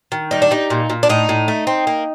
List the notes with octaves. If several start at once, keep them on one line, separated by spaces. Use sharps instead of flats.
D#3
G3 D#4
D4
G3 D#4
A#2
A#2
D4
A2 D#4
A2
A3
C4
A#3